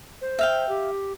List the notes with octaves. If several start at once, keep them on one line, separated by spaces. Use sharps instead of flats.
C5
E5 F5 G5
G4